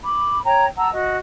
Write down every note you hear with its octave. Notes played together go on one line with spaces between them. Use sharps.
B5 D6
C#5 G5 A#5
F#5 A5 A#5 E6
F#4 D#5